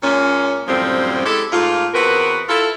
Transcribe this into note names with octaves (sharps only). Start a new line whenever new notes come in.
A#2 G#3 A#3 C#4
F#2 A2 D3 F3 G3 C4
G#3 E4 G4 A4
G#2 A3 A#3 F4
E2 B3 C4 F#4 A#4 B4
E4 F4 A4